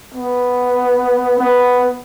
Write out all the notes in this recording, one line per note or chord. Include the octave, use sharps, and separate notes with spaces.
B3
B3